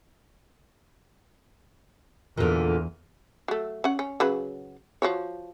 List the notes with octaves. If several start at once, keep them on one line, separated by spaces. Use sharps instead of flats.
E2 A#2 D3
F#3 A3
C#4 F#5
C#4
C#3 F#3 B4
F3 F#4 C#5